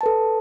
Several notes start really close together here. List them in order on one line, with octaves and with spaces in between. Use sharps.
A5 B4 A4